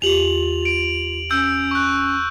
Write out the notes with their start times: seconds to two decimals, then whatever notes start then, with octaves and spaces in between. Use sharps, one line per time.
0.02 E2 F4 G4 F7 F#7
0.65 D7
1.31 C#4 E6 G6
1.71 C#6 F#6